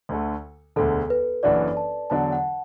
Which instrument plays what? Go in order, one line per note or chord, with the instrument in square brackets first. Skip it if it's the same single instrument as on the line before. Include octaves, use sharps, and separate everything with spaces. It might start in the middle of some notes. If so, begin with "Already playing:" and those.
[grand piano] D2 D3 A3
[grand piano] E1 D2 D3 [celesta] A4
[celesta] B4
[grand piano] F#1 F#2 E3 D4 F#4 [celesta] D5
[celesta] A5
[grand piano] E2 D3 F#3 D4 [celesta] A5
[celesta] F#5